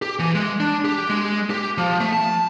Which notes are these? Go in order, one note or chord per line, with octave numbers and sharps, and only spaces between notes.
G4
E3
G#3
D4
G4
G#3
G4
F3
A3
A5